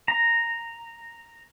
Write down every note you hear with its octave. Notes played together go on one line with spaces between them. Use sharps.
A#5